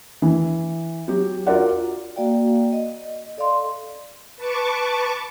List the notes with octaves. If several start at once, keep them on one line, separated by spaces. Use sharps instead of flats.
E3
F#3 F#4 G4
F4 F#4 A#4 D5 F#5
A#3 F#4 D5 F5 G5
D#5
A4 D5 D#5 F5 C6
B4 A5 C#6 D6